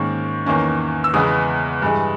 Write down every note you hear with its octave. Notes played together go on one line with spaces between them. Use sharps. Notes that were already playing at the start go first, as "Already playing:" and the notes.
Already playing: G#2 D#3 A#3 C#4 C#6
E2 D#3 A#3 C#4
E6
E2 C#3 G#3 B3 D#6
G2 E3 G#3